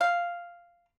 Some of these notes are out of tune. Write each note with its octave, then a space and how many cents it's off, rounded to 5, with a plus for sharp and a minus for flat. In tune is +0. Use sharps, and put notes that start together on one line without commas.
F5 -5